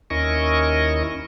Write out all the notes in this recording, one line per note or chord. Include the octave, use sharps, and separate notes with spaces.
D#2 C#4 E4 A#4 D#5 C#6